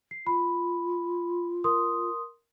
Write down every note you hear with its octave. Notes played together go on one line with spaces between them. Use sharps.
C7
F4 B5
A#4 C6 D#6